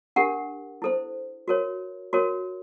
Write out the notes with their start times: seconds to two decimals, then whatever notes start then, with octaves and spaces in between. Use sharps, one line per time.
0.16 D4 G4 A#4 F#5
0.82 E4 A4 C5
1.48 F#4 A#4 C#5
2.13 F#4 A#4 C#5